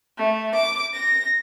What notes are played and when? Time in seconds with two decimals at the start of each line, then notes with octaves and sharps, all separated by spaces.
0.17 A3
0.54 D6
0.93 A#6